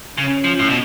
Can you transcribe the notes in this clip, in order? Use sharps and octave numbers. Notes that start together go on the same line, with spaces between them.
C#3 C#4
F3
A2
B2